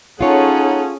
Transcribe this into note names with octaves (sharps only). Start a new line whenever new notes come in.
C#4 D#4 F4 G#4 A4 C#5 F#5